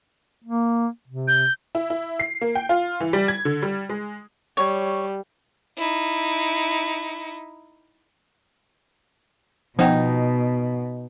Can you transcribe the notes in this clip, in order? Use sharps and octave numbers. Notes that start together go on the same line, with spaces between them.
A#3
C3
G6
E4
E4
C7
A#3
G5
F4
E3
G3
G#6
D3
G3
G#3
G3 C#5
D#4 E4
B2 F3 B3 D#4 F#5 G5